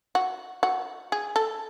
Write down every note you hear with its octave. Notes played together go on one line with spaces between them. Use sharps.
F#4
F#4
G#4
A4